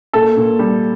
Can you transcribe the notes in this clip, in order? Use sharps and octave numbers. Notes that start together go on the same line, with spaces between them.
A#2 A4
A#2
G3